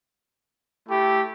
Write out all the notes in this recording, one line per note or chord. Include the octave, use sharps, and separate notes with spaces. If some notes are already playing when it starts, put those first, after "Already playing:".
A3 E4 G4